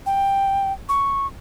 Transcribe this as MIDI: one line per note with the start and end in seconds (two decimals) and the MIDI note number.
0.06 0.73 79
0.89 1.27 85